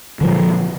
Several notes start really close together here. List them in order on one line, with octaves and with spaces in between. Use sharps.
D3 F3 A#2